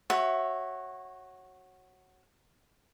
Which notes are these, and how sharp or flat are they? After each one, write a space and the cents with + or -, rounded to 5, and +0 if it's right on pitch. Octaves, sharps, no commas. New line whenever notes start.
F#4 +5 C#5 -20 E5 +0